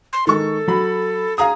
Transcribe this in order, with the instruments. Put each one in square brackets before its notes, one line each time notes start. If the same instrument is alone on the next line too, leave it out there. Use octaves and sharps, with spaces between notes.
[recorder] C6
[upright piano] D#3 G#3 C#6 [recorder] A4
[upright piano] F#3 B5
[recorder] G#4 [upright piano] F5 A#5 D#6